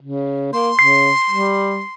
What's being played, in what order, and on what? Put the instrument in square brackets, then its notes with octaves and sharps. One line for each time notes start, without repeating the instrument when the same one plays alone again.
[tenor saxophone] C#3
[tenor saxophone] A#3 [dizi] C6
[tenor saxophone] C#3 [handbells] C7
[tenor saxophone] G3